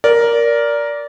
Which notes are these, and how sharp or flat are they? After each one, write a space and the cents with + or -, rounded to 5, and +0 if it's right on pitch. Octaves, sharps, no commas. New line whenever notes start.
A#4 +5 D5 -15